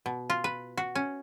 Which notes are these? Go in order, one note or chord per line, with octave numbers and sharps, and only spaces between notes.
B2
F4
B4
F#4
C#4